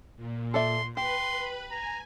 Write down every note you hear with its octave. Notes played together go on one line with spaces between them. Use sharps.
A#2
A4 D5 E5 C6
G4 B4 B5 C6
G#5 A#5